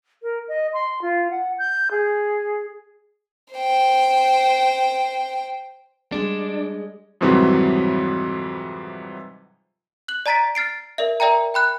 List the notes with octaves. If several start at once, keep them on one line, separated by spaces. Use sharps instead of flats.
A#4
D#5
C6
F4
F#5
G6
G#4
C5 G5
G3 G#3 D4
F2 G#2 C3 E3 F#3 G3
F#6 F#7
D5 A5 A#5 A6 B6 D7
F6 A6 C7 D7
A#4 D5 E5
A#4 D5 E5 G5 A#5
G5 B5 F#6